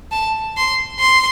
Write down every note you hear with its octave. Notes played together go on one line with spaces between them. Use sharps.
A5
C6
C6